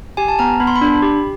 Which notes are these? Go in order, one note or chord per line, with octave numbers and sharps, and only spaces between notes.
G4 G#5
A5
B3 A#5
B3 B5
C6
B5
D4
G4